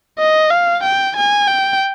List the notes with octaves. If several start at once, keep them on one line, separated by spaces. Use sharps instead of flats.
D#5
F5
G5
G#5
G5